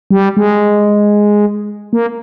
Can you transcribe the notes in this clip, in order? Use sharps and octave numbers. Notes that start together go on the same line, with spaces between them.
G3
G#3
A#3